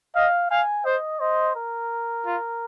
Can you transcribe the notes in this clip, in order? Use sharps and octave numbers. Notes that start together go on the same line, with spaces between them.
D#5 F5
F5 G#5
C5 D#5
C5 D#5
A#4
F4